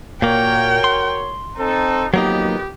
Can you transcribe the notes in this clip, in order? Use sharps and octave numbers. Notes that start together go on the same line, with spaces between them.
A#2 A#3 F#4 A#4 C#5 G5
C6
C4 D#4 A4
F2 D#3 F#3 A#3 B3 D#4 G4